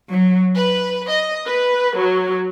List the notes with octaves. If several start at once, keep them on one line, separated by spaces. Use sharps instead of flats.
F#3
B4
D#5
B4
F#3